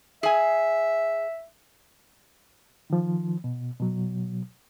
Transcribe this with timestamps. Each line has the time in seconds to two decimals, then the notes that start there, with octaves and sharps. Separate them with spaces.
0.23 G#4 E5 G#5
2.90 D#3 F3
3.44 B2
3.79 B2 F#3